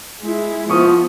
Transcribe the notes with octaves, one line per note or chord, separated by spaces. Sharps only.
G#3 E4
F3 B3 C#6 D#6